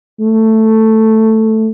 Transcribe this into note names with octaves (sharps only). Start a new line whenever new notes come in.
A3